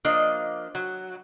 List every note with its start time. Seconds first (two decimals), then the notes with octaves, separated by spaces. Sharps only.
0.05 F3 A#3 D4 D#5
0.75 F#3